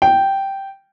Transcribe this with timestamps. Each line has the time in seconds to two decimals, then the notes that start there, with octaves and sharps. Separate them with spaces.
0.02 G5